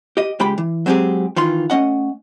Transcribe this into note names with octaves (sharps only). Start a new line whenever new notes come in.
G4 D#5
C#2 G#3 G4 G5 B5
E3
F#3 G#3 C4 E4 G4 G#4
D#3 E3 F4 C6
A3 C#4 D#5 F#5